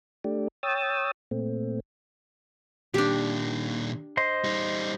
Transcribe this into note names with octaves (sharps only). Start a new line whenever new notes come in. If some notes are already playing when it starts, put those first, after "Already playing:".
A3 D4 G4
C#5 G5 D#6 E6 A6
A#2 A3 C4
A#2 D#3 D4 G4
C5 D#5 C6
G3 D#4